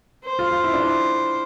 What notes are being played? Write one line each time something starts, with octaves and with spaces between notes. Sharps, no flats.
C5
F4
F4
E4
D4
E4